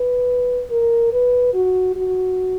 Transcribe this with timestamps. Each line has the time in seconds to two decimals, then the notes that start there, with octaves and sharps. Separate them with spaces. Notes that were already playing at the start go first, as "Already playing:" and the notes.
Already playing: B4
0.70 A#4
1.12 B4
1.54 F#4
1.96 F#4